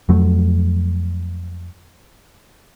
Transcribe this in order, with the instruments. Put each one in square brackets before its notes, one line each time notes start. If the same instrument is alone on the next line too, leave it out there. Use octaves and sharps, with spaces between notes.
[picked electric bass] F2 F#3 A3